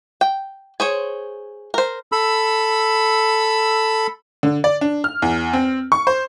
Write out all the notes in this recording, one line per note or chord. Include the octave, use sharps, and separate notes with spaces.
G5
G#4 C5 C#5
A#4 C5
A4 B5 E6
D3
D5
D4
F6
E2
C4
C#6
C5